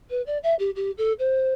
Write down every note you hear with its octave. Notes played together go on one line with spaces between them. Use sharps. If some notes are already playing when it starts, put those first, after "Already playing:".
B4
D5
E5
G4
G4
A4
C5